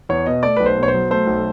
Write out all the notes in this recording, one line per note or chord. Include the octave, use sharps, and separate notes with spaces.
E2 C#5
B2 D#5
A3 D5
B1 B4
C5
B2
C#5
C5
F#3
A3 C5
B1